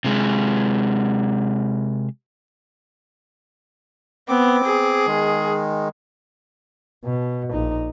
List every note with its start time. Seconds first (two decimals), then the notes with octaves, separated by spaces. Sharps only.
0.04 C3 G#3
4.29 B3 C4 D6
4.65 G#4
5.07 D#3 G#3
7.05 B2
7.52 A#1 D#4